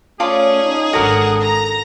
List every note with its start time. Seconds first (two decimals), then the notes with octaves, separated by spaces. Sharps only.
0.20 A3 C#4 F4 G#4 D5 A5
0.63 D#4
0.93 G#1 D4 F#4 A4 A#4 F#5
1.40 A#5 A#6